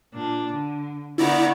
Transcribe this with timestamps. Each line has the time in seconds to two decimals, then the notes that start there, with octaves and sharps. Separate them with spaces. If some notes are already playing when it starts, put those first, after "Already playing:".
0.14 A#2 D4
0.52 D3
1.18 D3 D#3 B3 E4 D5 A#5